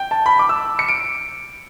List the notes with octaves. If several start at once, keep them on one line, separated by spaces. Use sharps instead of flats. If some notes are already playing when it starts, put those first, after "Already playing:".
Already playing: G5
A5
B5
D6
E6
C#7
D7